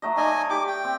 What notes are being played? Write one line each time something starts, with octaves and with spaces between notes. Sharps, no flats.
F#3 A3 D#5
D#4 A4 D5 D#5 G#5
G4 D6
G5
C4